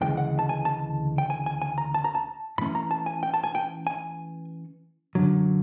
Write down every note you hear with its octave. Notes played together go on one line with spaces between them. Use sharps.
D2 C#3 E3 G#3 G5
F#5
A5
G#5
A5
G5
G#5
G#5
G#5
A#5
A5
A#5
A5
G#2 E3 A3 C#4 B5
A#5
A5
G#5
G5
A5
G#5
G5
G#5
F#2 D3 F#3